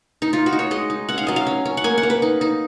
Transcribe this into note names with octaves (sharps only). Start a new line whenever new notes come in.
D#4
D#4 F4
F#4
D#4
C#5
G#3 D#5
D#4
C#4 F#5
F5
F#3 D#5
F5
C#4
C#4
F#5
A#3 G#5
F#5
A#3
B4
D#4
D#4